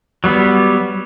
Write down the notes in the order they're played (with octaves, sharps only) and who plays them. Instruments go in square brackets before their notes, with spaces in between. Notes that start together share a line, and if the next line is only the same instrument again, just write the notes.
[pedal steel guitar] F#3 G3 B3